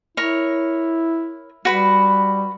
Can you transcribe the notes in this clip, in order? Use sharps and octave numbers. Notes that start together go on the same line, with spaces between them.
E4 A#4 C#5
G3 F#4 B4 B5